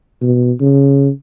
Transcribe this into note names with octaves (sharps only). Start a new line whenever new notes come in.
B2
C#3